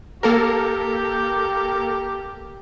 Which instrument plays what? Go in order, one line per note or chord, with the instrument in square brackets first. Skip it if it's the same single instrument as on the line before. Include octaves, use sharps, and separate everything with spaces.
[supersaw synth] A#3 A4 A#4 [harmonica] G4